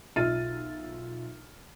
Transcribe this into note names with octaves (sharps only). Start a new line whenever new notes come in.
B1 F4 E5 F6 A6 D#7